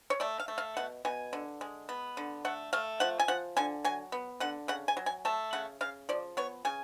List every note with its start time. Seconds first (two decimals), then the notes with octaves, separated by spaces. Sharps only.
0.10 C#5
0.20 A3 D5
0.40 F5
0.48 A3
0.58 F5
0.77 B2 F#5
1.05 B2 G#5
1.33 D3
1.61 G#3
1.89 B3
2.17 D3
2.45 A3 F#5
2.73 A3 F5
3.00 F3 F#5
3.19 G#5
3.28 F3 F#5
3.57 D3 G#5
3.84 F#3 G#5
4.12 B3
4.40 D3 F#5
4.68 C#3 F#5
4.88 G#5
4.97 F#3
5.06 G#5
5.25 A3 A5
5.53 C#3 F#5
5.81 C#3 F5
6.09 F3 D5
6.37 B3 C#5
6.65 C#3 G#5